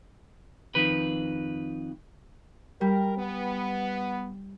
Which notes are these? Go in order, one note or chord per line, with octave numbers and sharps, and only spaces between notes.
F2 D#3 B4
G3 A#4
B3